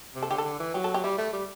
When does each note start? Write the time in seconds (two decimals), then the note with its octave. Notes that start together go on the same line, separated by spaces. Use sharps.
0.15 C3
0.23 A4
0.30 D3 G4
0.38 A4
0.45 D3
0.60 E3
0.74 F#3 G4
0.84 A4
0.94 G4
1.04 G3 E4
1.18 A3
1.33 G3